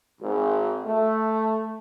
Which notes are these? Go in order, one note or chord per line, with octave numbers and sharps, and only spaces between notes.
G#1
A3